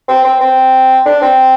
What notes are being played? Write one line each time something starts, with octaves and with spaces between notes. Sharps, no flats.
C4
C4
C4
D4
C4